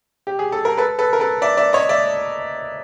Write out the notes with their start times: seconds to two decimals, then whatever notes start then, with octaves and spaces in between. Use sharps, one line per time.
0.27 G4
0.39 G#4
0.52 A4
0.65 A#4
0.77 A4 B4
0.98 A4 B4
1.13 A#4
1.20 A4 B4
1.42 D5 E5
1.57 D5 E5
1.73 C#5 D#5
1.89 D5 E5